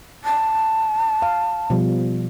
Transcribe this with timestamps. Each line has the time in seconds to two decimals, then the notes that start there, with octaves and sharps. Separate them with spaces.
0.25 A5
1.22 F5
1.70 B2 F3 G3